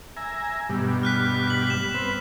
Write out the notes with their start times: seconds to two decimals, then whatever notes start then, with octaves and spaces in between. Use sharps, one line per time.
0.17 E5 G#5 A#5
0.69 G2 B2 G3
1.03 F6 F#6 B6
1.47 B6 F#7
1.67 B6 E7
1.94 C4 B4